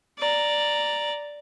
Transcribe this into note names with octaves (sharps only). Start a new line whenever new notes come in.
D5 A#5